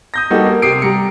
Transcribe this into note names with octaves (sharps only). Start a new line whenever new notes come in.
D#6 G6 A#6
G3 A#3 B3 D#4 F#4 A4
A#3
C3 D#6 C7 D7
G3 A#5 C#7